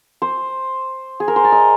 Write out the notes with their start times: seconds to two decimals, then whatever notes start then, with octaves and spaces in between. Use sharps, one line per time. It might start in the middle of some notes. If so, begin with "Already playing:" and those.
0.22 C5
1.20 G#4
1.28 A#4
1.36 C5
1.44 D5
1.52 D#5